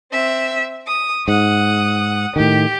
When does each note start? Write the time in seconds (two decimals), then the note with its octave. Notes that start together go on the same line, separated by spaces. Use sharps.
0.12 C4 E5
0.87 D#6
1.28 G#2 F#5 D#6
2.36 A2 D#3 G4